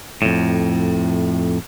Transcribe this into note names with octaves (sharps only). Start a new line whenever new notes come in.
F2 A2